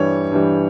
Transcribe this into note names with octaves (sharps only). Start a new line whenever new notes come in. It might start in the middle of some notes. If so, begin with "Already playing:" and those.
Already playing: G2 E3 G3 C#5
G2 E3 G3